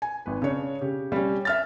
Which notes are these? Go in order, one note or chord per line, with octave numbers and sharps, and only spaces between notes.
G#5
G#1 B4
C#3 D4 C#5
C#3 G4
G3 C#4
E5 F6 A6